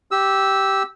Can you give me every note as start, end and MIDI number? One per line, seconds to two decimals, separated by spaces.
0.11 0.83 67
0.11 0.83 88